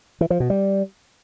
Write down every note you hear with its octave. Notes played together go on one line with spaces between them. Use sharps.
E3
F3
B2
G3